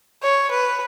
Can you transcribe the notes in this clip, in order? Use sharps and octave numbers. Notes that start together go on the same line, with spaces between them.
C#5
B4